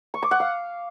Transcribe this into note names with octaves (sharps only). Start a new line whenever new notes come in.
C#6
D6
F#5
F5